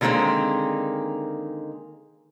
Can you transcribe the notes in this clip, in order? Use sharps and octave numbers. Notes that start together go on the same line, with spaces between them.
D3 D#3 G#3 A#3 C4 D#4